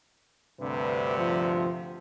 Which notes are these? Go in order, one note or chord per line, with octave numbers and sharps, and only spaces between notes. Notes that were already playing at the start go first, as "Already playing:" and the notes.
D2 G2 C3 B4
F3